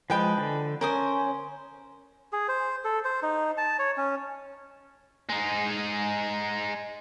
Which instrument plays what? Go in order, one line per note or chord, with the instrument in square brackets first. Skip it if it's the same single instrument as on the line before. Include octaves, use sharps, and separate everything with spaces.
[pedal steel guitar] F3 G#3 [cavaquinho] B4 G5 B5
[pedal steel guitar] D3
[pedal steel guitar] C#4 [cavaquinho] A#4 C5 D#6
[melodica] G#4
C5
A4
C5
D#4
A5
C#5
C#4
[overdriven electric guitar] G#3 D#4